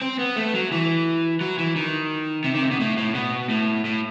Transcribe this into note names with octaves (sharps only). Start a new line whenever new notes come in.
C4
B3
A3
F#3
E3
F#3
E3
D#3
C3
D#3
C3
B2
A2
A2
B2
A2
A2